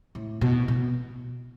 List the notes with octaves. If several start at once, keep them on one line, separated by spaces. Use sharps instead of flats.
A2
B2
B2